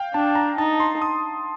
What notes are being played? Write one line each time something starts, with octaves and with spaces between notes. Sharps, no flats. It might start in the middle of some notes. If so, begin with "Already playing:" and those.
Already playing: F5 G5
D4 A5
A#5
D#4 A5
C6
D#6